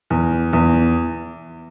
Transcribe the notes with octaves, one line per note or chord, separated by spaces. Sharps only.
E2
E2